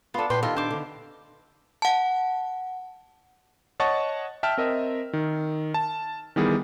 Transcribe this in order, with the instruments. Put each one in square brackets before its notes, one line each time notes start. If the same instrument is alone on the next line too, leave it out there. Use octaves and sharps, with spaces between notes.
[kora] B3 D4 [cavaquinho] F4 A4
[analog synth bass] A#2 [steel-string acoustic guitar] B4 [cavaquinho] G5 C6
[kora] D#3 A4 [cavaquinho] F4 [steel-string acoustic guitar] G4
[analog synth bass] D4 [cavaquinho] C5 D6
[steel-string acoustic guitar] D3
[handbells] F#5 A5
[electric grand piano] C#5 D#5 F#5 A5 C#6 A6
E5 G5 A5 E6 F6
C4 A#4 D#5 E5
D#3
A5
D#3 E3 G3 B3 G4 G#4